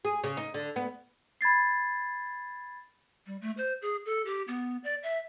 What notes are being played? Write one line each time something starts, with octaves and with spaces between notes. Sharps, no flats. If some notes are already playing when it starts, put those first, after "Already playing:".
G#4
C#3
D#4
D3
B3
B5 G#6 A6 C7
G3
A3
C5
G#4
A4
G4
B3
D5
E5